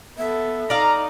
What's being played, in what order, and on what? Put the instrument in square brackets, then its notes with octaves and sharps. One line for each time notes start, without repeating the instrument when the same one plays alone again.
[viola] B3 A4 [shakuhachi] E5
[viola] D#4 [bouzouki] D5 F5 [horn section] A#5